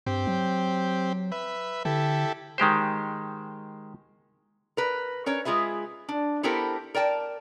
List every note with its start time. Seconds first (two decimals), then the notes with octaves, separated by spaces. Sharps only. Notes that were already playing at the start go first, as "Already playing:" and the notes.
0.07 G2 C4 G4
0.27 F#3
1.32 B4 E5
1.85 D3 E4 G4 A4
2.58 D#3 G#3 G4 C5
4.77 A#4 B4
5.26 C#4 A#4 C#5
5.45 G#3 F4 G#4 B4 E5
6.09 D4
6.43 B3 E4 G4 A4 A#4 C5
6.95 A#4 D5 G5 A5